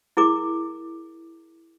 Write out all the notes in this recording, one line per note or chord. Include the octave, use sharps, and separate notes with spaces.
E4 G#4 A#4 D6